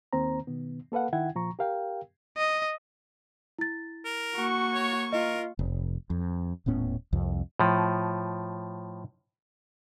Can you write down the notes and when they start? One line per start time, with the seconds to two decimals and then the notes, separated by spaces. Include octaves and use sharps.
0.13 D#2 D#3 A#3 C4 C5 A#5
0.47 B2 D#3 B3
0.92 A#3 A4 B4 F5 F#5
1.13 D#3 E4 F#5 G5 G#6
1.35 A#2 F3 A#5 C#6
1.59 G4 A#4 F5 G5
2.37 D#5
3.59 E4 A6
4.05 A#4
4.36 A#3 F#4 C#6
4.73 C#5
5.13 F4 A#4 D#5
5.59 F1
6.10 F2
6.66 D#1 A2 B3 C#4
7.13 C2 F2
7.59 A2 F3